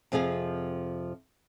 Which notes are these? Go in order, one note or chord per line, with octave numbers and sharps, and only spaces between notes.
F2 C3 F3 G#4 F5